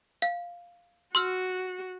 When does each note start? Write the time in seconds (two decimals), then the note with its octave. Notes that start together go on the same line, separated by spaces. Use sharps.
0.22 F5
1.15 F#4 C6 E6 F6